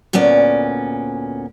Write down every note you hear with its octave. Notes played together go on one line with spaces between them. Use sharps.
D2 A#2 B3 C#4 D5